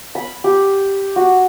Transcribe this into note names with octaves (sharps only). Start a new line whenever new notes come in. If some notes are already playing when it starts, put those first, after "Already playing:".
B5
G4
F#4